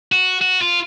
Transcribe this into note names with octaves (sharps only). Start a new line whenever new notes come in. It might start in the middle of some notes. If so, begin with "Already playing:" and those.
F#4
F#4
F4